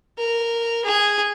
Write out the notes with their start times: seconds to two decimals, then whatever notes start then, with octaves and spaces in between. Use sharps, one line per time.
0.18 A#4
0.85 G#4